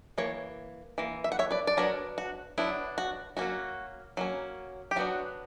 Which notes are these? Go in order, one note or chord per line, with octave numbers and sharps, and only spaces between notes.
E3 A#3 C#5
E3 A#3
E5
F#5
C#5 E5
B4 D5
D5
F#3 B3 D4 A#4 C#5
F#4
F#3 B3 D4 E4
F#4
F#3 A#3 C#4 F#4
F#3 A#3 C#4
G4
F#3 B3 D4 F#4